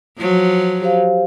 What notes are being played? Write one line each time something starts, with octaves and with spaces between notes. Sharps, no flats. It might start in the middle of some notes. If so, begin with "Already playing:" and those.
F3 F#3
G4 C5 F5